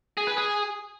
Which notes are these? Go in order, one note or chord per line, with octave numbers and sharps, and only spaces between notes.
G#4
B4
G#4